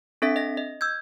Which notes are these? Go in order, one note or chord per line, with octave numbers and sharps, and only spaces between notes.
C4 D4 A4 E5 B6
D#5 A#6
D#5
E6 G6 G#6